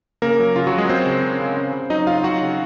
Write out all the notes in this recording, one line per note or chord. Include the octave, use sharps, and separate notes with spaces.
C#3 A#3 A#4
F#3
C#3 F4
F#3 F#4
C#3
G#3 G#4
F#3 C4 C5
C#3
C#3
C#3
C#3
C#3
F#3 D#4 D#5
F#3 F4 F5
F#3 F#4 F#5
C#3